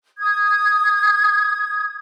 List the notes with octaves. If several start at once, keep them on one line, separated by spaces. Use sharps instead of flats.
D#6 G#6